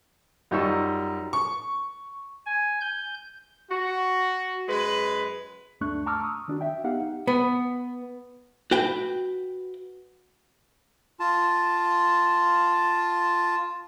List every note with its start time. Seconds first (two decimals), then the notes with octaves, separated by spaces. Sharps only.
0.51 F#2 G3 D#4 F4 C#6 E6
1.33 C#6
2.46 G#5
2.81 G6
3.69 F#4
4.68 F#2 G#3 B4
5.81 D2 G2 A3 D4 C#6 F#6
6.06 A5 A#5 C#6 D6 E6 F6
6.24 D#6
6.48 D#3 D4 F#4
6.61 E5 G5
6.84 B3 D#4 G4 F5 F#5
7.27 B3
8.71 F#4 B4 G5
11.20 F4 A5